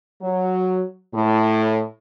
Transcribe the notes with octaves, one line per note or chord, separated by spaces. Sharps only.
F#3
A2